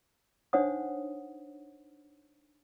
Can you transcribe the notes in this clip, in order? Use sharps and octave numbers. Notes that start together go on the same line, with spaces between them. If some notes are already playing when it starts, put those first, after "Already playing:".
D4 D#4 C5 C#5 F#5 D#6